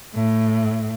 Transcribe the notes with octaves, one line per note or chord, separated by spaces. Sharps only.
A2